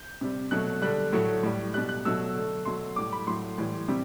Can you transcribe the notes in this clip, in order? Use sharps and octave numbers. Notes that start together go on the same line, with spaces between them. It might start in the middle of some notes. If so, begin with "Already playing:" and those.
Already playing: G6
C3 G3
B2 F#3 A3 F#6
D3 G3 F#6
A2 F#3 A3
A2 G3
B2 G3 F#6
F#6
B2 F#3 A3 E6
D3 A3
B2 F#3 A3 C6
A2 G3 D6
B5
A2 F#3 A3 C6
A2 E3 G3
C3 G3